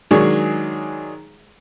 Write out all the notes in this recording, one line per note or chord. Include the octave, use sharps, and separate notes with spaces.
D#3 F#3 G#3 D4 G#4 C#5